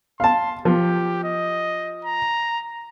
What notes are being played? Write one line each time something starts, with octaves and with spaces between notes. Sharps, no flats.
F5 A5 C6
F3 G4
D#5
A#5